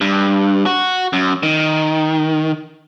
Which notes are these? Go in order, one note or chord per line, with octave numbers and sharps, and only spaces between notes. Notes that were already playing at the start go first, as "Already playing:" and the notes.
G2
F#4
F#2
D#3